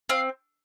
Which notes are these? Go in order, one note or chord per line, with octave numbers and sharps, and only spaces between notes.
C4 F5